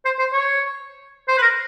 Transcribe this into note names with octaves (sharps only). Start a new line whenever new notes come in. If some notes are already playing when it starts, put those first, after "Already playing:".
C5
C5
C#5
C5
B4
A#4